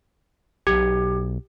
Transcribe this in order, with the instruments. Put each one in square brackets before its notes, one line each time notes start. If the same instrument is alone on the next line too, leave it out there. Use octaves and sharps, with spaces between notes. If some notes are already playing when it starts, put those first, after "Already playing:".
[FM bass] B1 [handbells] G4